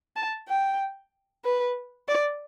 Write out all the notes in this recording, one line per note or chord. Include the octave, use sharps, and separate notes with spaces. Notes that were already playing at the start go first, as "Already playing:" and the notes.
A5
G5
B4
D5